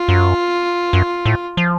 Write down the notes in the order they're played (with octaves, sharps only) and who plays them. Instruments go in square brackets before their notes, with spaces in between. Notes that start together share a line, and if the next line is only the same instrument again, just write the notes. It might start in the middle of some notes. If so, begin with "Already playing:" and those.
Already playing: [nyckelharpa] F4
[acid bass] F#2
F#2
A2
F3